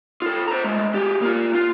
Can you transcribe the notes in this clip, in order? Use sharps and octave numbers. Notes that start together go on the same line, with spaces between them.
F4 A4
C5 A#5
G#3 A3
G4 G#4
A#3 F4
F4